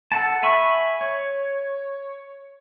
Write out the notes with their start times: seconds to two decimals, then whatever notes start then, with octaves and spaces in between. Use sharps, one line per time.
0.12 A4 F#5 A5
0.43 E5 G#5 B5 C#6
1.01 C#5